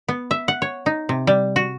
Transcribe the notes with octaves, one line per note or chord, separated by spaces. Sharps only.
B3
E5
F#5
C#5
D#4
C3
G3
F#4